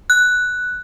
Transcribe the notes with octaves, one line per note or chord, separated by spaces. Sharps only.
F#6